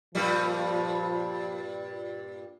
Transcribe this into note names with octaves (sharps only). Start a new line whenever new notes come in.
G2 A#2 F3 G3